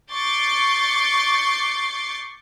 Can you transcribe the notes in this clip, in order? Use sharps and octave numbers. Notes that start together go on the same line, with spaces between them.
C#6 D6 G6 A6 C7